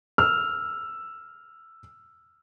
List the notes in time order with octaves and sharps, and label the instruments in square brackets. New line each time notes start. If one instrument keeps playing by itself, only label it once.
[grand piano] E6 F6